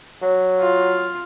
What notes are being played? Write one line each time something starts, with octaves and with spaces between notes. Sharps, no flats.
F#3
F4